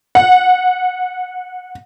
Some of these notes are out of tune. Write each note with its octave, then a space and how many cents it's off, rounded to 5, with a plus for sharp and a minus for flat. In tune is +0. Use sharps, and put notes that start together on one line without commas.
F#5 -20